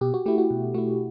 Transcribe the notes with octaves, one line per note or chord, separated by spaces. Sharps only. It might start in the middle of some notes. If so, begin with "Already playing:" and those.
B2 G4
F#4
A3 E4 G4
F#4
B2
A3 E4 F#4